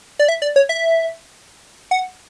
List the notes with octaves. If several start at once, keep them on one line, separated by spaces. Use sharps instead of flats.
D5
E5
D5
C#5
E5
F#5